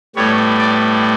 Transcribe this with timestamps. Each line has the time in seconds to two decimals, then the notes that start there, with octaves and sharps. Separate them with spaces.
0.16 A2 G3 B3 C#5
0.58 D5